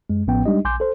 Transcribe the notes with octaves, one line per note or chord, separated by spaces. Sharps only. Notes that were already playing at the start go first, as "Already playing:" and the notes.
F#2 G#3
A1 A2 F3 B3 C#4 G5
G3 G#3 D4 D#4 G4 D#5
A#1 G#5 C6 D6 G6
A4 C5